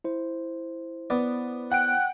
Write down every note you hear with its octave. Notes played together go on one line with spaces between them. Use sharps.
E4 C5
B3 D5
F#5 G5 F#6 D7